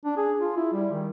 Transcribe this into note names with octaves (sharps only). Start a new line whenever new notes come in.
D4
G#4
F4
E4
G3
D#3